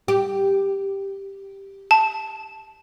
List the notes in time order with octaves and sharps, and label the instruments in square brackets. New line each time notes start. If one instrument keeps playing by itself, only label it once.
[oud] G4
[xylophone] A5